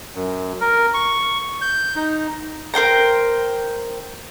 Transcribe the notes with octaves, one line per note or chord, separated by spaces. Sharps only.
F#2
A#4
C#6
G6
D#4
A#4 C5 G5 A#5